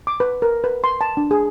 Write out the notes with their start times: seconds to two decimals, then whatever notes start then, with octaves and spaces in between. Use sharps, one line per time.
0.07 D6
0.20 B4
0.42 A#4
0.64 B4
0.84 C6
1.01 A5
1.17 D4
1.31 G#4